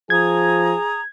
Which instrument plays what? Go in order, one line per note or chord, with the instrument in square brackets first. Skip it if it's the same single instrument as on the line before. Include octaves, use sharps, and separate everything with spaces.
[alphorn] F3 [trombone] G#4 [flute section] A#5 D#6 [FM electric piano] G#6